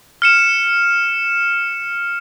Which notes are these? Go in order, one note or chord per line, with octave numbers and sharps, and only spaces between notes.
F6 C#7 E7